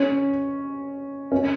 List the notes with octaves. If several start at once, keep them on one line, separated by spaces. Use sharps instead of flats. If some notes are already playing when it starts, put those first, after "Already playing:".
Already playing: C#4
C#4